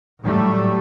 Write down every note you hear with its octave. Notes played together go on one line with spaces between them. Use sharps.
A2 F#3 G3 A3